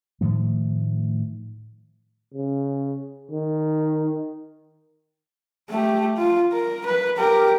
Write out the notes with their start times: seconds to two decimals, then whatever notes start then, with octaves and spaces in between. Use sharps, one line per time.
0.21 A2 D#3 F3 A3
2.34 C#3
3.31 D#3
5.69 A3 G4
6.17 F4
6.52 A#4
6.86 B4
7.17 G4 A#4